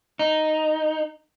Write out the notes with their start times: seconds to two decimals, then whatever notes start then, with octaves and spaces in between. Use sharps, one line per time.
0.19 D#4